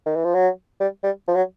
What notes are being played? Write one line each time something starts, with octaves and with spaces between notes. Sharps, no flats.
D#3
E3
F3
F#3
G3
G3
F3
F#3